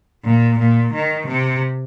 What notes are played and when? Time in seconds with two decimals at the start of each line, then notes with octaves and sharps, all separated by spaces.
0.24 A#2
0.59 A#2
0.93 D#3
1.27 C3